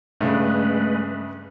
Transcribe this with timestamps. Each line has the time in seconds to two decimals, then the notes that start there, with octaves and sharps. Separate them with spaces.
0.21 G2 C#3 G#3 A3 B4